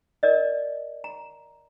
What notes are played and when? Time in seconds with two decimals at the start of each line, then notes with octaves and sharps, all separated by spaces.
0.23 A#4 D5 D#5
1.04 A#5